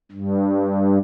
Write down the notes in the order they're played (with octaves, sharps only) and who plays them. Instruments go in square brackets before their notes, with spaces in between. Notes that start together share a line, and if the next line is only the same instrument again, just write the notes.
[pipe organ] G2